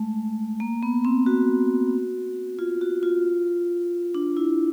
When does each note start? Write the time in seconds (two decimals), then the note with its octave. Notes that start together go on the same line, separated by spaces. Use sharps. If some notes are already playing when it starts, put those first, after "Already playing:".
Already playing: G#3 A3
0.60 A#3
0.83 B3
1.05 C4
1.26 F#4
2.59 F4
2.81 F#4
3.03 F4
4.14 D4
4.37 E4